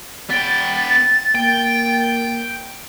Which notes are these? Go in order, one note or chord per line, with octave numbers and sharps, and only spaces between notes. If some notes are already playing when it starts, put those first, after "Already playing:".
B3 G5 A6
A#3 G5